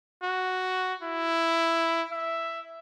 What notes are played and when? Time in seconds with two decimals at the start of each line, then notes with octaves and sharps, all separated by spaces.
0.23 F#4
1.03 E4
2.12 E5